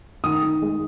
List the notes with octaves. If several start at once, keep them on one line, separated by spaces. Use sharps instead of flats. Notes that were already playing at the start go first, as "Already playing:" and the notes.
D#3 D#6
D#3
G#3